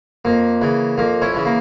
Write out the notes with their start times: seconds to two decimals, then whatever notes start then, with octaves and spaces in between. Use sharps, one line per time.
0.25 F2 A#3
0.61 C#3 E3
0.98 F2 A#3
1.22 C#4 E4
1.34 C#3 E3
1.46 A#3